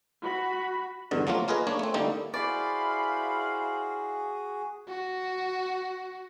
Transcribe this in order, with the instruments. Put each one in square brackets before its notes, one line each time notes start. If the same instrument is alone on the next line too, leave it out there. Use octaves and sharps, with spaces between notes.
[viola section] F#4 B5
[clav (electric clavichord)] E2 G2 B2 D3
F3 F#3 A3 A#3 F4
A#3 F4 G#4 B4 D#5
A#3 D4 C#5
A3 C4
D3 G3 A3 A#3 D#4 E4
[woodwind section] E4 C5 F5 [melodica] F#4 G#4 [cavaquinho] D5 [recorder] B5
[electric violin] F#4